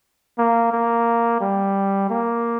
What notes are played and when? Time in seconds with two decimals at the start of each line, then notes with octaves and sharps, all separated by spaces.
0.38 A#3
0.72 A#3
1.41 G3
2.10 A#3